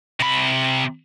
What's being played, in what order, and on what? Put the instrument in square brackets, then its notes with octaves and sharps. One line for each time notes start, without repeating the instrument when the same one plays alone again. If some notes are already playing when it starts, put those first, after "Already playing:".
[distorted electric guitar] C3 B5